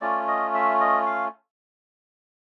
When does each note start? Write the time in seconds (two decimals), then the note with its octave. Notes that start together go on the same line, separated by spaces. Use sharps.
0.01 A3 C#4 F4 D5
0.28 D#5
0.54 E5
0.80 D#5
1.06 F5